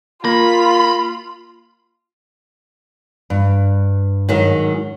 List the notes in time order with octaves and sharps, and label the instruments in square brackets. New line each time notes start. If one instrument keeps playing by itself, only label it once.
[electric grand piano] A#3 A#6 [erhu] F4 [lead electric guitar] B5
[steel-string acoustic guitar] G2
[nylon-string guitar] G#2 D#3 F#3